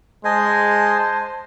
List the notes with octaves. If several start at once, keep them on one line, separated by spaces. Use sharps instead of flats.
G#3 C5 D#5 G#5 A5